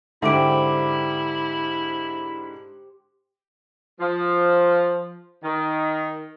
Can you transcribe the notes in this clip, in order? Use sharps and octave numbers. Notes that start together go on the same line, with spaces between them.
G#2 D3 E4 G4 C5 E5 D6 D7
F3
D#3